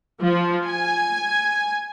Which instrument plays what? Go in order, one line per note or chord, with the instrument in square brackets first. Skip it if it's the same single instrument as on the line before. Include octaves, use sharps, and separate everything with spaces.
[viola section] F3
G#5